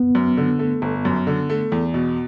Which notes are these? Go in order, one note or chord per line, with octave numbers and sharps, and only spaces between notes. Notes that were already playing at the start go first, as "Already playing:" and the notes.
Already playing: B3
F#2
D3
A3
G1
F#2
D3
A3
E2
B2